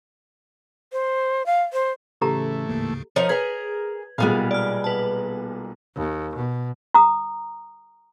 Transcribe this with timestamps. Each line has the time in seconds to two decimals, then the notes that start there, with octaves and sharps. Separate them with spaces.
0.92 C5
1.46 F5
1.73 C5
2.22 A2 C#3 E3 A3 G4 A4 A#5
2.69 D2 G#2 C#3 A#3
3.16 F3 D#4 A#4 C#5
3.29 G#4 A#4 B4 G#6
4.18 B1 A#2 G3 G#3 B3 F5
4.51 D5 F6
4.84 B4 A5
5.96 D#2
6.35 B2
6.94 A#5 D#6